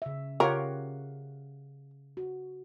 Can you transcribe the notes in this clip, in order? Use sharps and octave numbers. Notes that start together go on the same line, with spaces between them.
C#3 E5
C#3 F4 G4 A#4 C#5 F5 F#5
F#4